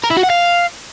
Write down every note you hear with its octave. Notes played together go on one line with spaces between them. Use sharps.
A#4
E4
F#4
F#5
F5